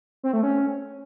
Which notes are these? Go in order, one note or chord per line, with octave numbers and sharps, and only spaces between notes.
C4
A3
C#4